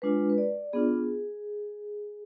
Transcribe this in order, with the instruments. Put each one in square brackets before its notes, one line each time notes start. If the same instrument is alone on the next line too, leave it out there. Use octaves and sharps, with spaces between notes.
[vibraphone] G#3 D4 F4 B4
B4
D5
B3 D4 F4 G#4